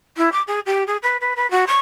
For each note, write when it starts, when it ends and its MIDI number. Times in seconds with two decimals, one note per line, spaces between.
0.17 0.30 64
0.32 0.42 86
0.48 0.60 68
0.66 0.84 67
0.87 0.97 68
1.03 1.17 71
1.21 1.34 71
1.36 1.49 71
1.51 1.65 66
1.67 1.79 85